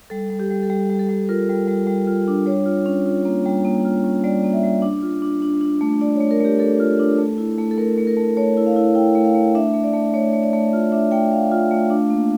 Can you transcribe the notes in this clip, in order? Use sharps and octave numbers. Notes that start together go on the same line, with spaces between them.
G3 A4
G3
G4
G3
A4
G3 G4
G3
A4
G3
F4 A#4
G3
G3
G3
F4
D4
G3 C#5
F4
C#4
F4
A#3
G3
A#3
F4
C#4
G3 D5
A#3
E5
G3
D4
F4
D4
D4
D4
A3
D4 D5
A3 C#5
A#4
A3 G4
A3 A4
F4
D4
A3
E4
A3
A4
A3 A#4
A3
A#4
A3
A3 C#5
E4
F5
E4
E4 G5
A3
F5
A3
D4 E5
A3
D5
A3
A3 C#5
A3
D5
A3
F4
D4 E5
A3 G5
A3 F5
F4
A3
D4
A#3